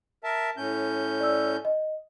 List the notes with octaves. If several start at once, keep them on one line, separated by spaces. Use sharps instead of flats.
A#4 E5 A5
A2 C#4 G6
D5 E6
D#5